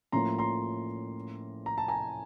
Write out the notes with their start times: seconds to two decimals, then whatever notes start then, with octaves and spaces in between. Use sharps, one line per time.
0.12 A2 F3 A#3 C#4 F4 A#5 C6
0.38 A#5 C6
1.66 A#5
1.78 A5
1.88 G#5 A#5